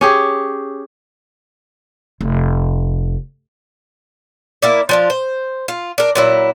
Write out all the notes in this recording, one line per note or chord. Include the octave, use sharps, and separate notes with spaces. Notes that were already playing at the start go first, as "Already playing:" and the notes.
C#4 G4 G#4
F1
A#3 E4 D5
F3 D4 F4
C5
F4
D4 A#4
A#2 F#3 E4